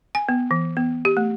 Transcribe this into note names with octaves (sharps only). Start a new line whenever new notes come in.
G#5
B3
E3
B3
G4
A3